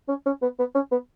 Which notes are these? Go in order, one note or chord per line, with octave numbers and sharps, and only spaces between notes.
C#4
C#4
B3
B3
C#4
B3